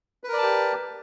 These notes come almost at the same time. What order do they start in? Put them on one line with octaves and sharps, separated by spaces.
B4 A#4 D5 A5 G4